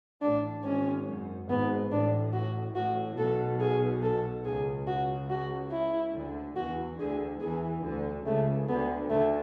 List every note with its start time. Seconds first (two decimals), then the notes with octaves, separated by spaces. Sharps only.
0.22 A1 A2 D4
0.64 G#1 G#2 C#4
1.07 F#2
1.49 G#1 G#2 B3
1.91 A1 A2 D4
2.33 F#4
2.76 A1 A2 F#4
3.18 B1 B2 A4
3.60 G#4
4.03 A4
4.45 C#2 C#3 G#4
4.87 F#4
5.30 F#4
5.72 E4
6.15 D2 D3
6.56 E2 E3 F#4
6.99 D2 D3 G#4
7.41 E2 E3 G#4
7.84 D2 D3
8.26 C#2 C#3 A3
8.68 D2 D3 B3
9.10 D2 D3 A3